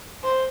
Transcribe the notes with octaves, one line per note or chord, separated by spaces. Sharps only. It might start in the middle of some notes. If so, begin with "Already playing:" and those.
C5